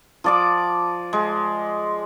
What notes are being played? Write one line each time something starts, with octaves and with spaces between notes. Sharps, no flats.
F3 D5 D6
G#3